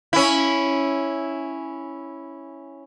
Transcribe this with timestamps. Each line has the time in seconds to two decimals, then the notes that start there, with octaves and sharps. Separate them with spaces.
0.13 C#4 E4